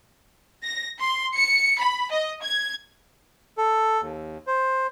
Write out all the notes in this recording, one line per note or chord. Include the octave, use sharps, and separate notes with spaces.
A#6
C6
C#7
B5
D#5
G#6
A4
D#2
C5